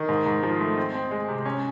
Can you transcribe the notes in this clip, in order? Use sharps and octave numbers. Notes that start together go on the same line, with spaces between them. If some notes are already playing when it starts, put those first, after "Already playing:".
Already playing: D#3
G#2
G#2
F3
A3
C4
C4
G#3
C3
C#4